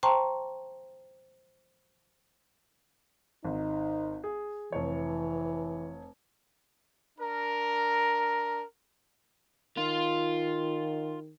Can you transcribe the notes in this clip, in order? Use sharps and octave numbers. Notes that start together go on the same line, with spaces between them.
C5 G5 A5 A#5 C6 C#6
G#1 D#4
G#4
F1 E3 C#5
D4 A#4
D#3 F4